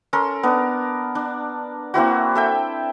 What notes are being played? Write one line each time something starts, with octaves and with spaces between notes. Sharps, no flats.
C#4 A4 A#4 C6
B3 D4 A#4
D4
A#3 C4 E4 F#4
A4 E5 G5